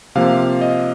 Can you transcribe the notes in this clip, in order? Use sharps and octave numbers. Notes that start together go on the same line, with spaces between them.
C3 F3 A#3 F5
D#5